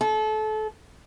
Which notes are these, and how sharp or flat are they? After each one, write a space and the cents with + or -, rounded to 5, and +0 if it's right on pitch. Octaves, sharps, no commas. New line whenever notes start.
A4 -30